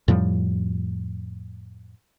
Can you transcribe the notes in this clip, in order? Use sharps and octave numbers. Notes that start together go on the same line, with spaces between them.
F2 A2 F3 G3